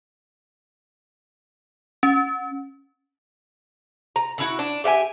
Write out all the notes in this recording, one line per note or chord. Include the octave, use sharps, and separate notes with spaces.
C#4
A#5
D3 E4 F#4
D4
G4 E5 G5 G#5